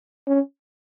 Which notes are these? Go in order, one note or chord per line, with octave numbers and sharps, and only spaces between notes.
C#4